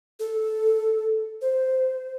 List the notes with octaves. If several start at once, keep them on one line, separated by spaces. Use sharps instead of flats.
A4
C5